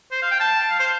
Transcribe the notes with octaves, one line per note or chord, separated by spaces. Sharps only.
C5
F5
G5
A5
F5
C5